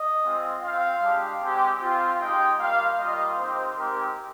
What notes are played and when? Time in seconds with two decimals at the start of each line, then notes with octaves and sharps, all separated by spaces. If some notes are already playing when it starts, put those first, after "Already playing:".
Already playing: D#5
0.23 G#3 C4 F4
0.62 C4 F4 F5
1.01 G#3 D4 G4
1.41 G#3 C4 G4
1.80 C4 F4
2.19 G#3 D#4 G4 G5
2.59 G3 A#3 F4 F5
2.98 G3 A#3 F4 D#5
3.38 C4 D#4 G4 C5
3.76 G#3 C4 D#4 G4 A#4